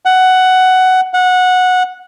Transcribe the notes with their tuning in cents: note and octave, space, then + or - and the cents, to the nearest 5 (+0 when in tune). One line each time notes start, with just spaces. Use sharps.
F#5 +10
F#5 -15